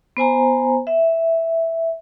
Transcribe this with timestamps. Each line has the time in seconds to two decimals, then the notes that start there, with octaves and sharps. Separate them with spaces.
0.17 B3 C5 G#5 A#5
0.87 E5